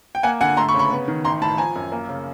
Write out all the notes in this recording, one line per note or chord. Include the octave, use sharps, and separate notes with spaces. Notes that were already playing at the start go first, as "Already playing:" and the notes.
G5
A#3 F#5 G#5
D3 F#5 G#5
A3 A#5 C6
B5 C#6
C#3
B5 C#6
B3
D#3
A1 A#5 C6
A2 A5 B5
F3 G#5 A#5
F#2
A#3
C#3